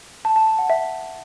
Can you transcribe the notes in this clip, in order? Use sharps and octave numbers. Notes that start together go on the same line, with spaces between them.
A5
A5
A5
F#5
E5